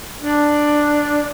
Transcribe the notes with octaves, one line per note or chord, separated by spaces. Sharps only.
D4